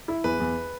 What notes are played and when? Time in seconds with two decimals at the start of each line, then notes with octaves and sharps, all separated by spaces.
0.08 E4
0.24 E2 B4
0.40 E2